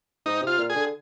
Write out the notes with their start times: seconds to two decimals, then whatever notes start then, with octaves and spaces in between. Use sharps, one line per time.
0.26 G#2 D#4
0.41 C3
0.47 F4
0.58 A#2
0.70 G#4
0.75 D3